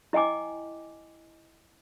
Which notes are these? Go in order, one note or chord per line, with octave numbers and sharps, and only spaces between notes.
E4 D#5 G5 G#5 D6